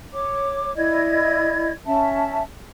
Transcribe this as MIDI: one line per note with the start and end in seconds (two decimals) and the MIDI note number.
0.13 0.72 73
0.13 0.72 86
0.76 1.71 64
0.76 1.71 74
0.76 1.71 75
0.76 1.71 92
1.86 2.41 61
1.86 2.41 76
1.86 2.41 81